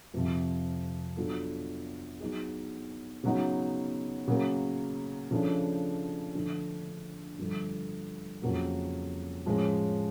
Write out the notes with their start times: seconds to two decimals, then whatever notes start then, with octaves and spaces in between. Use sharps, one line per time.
0.14 F2 C3 F3
1.17 F#3 B3 D4 F4 A4
2.20 F#3 B3 D#4 G#4
3.24 C#3 F#3 B3 D#4
4.28 C#3 F#3 A#3
5.31 C#3 F3 A3 D4
6.35 D3 F3 A3 D4
7.38 G2 D3 F3 A3
8.42 F2 C#3 F#3 A#3
9.46 A2 F3 G#3 C#4